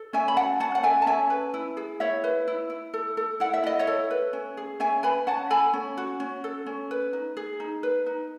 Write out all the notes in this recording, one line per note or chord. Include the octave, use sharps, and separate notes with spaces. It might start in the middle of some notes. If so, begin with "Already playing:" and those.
Already playing: A4
C#4 E5 G#5
B5
F#4 F#5 A5
C#4 F#5 A5
F#5
A4 E5 G#5
A5
C#4 E5 G#5
B4
E4
G#4
E4 C#5 E5
B4
E4
E4
A4
A4
E4 F#5
E5
E4 D#5
C#5 E5
A4
B4
C#4
G#4
C#4 E5 G#5
B4 G#5 B5
C#4 F#5 A5
A4 G#5 B5
C#4
F#4
C#4
A4
C#4
B4
D#4
G#4
D#4
B4
D#4